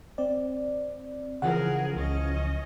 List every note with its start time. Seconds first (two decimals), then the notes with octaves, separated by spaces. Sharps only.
0.18 C4 D5
1.42 C#3 E3 F3 G#4 A#4 F#5
1.96 C#2 C#4 D#5